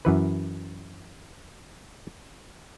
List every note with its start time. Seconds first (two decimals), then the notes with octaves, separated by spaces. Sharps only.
0.05 F#2 E3 B4